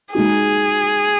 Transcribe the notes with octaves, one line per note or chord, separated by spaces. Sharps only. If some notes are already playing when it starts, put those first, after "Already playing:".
G#3 D#4 F#4 G#4